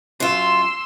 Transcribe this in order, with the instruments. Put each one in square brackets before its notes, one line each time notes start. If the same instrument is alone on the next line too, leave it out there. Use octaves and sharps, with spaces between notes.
[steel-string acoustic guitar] F#2 F4 [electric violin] C6 E6